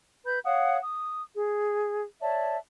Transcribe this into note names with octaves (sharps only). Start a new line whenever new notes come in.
B4 B5 G6
C#5 F5 F#5 D#6
D#6
G#4
C#5 D5 E5 A5